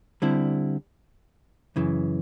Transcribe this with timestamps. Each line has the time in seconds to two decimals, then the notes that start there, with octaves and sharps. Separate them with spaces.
0.22 D3 G3 C4 E4
1.76 F#2 C#3 E3